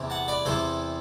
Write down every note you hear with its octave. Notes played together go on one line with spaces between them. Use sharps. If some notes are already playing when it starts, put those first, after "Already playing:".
Already playing: E2 C3 E3
F#5 A5
B4 D5
E2 C3 E3 A4 C5